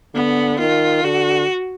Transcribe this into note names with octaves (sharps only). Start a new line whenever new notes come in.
D3 B3
D#3 F4
D3 F#4